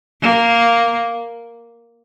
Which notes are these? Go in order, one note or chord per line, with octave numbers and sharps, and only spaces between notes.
A#3